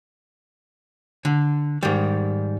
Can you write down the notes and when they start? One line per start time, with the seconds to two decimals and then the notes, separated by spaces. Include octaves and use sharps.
1.25 D3
1.83 G#2 D#3 G3